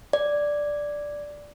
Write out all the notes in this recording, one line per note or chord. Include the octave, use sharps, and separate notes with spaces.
D5